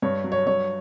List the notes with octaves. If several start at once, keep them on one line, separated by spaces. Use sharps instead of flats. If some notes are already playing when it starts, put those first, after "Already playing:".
G2 C#5
F#3
C#5
G2 C#5